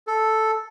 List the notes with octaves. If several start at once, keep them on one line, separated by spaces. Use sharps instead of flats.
A4